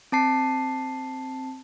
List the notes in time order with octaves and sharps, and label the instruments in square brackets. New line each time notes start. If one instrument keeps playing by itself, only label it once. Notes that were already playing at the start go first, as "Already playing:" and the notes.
[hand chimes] C4 A5 C7